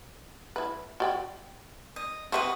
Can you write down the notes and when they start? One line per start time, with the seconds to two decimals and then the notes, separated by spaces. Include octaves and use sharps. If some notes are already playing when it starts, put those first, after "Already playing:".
0.56 E4 B4
1.00 F#4 D5 G5
1.96 D#5
2.32 C4 F#4 G4 B4 D#5 E5